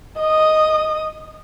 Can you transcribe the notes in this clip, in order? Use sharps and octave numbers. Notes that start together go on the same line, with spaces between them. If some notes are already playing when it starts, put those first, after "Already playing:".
D#5 D#6